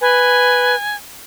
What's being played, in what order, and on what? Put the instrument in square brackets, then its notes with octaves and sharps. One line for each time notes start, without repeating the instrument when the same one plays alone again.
[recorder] B4 [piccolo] G#5